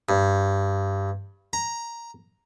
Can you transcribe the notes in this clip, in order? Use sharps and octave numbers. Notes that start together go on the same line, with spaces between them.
G2
A#5